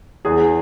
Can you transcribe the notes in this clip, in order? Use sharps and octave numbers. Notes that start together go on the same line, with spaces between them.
E2 G#4